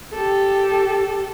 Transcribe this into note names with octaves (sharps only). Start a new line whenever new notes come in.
G4 A4